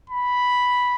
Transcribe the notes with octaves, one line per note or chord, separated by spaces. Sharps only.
B5